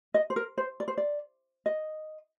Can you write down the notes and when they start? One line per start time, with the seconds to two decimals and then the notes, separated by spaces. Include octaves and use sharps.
0.14 D#5
0.30 C5
0.36 A#4
0.58 C5
0.80 D5
0.88 C5
0.98 D5
1.66 D#5